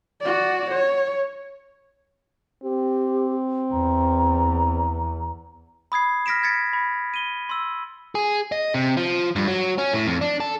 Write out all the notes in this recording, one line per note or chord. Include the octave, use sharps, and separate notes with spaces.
F#4 D5
C#5
C4 G4
E2 A#5
B5 D#6 G#6 C7
F6 A#6 B6 D7 E7
G#6 A6 B6 C#7
B5
D#7 G7
C6 E6
G#4
D#5
C3
F3
G2
F#3
C#4
A2
F2
D4
A4